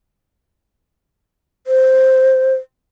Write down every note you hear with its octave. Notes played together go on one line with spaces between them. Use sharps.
C5